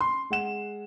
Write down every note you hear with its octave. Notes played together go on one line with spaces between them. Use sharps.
C6
G#3 F#5 E7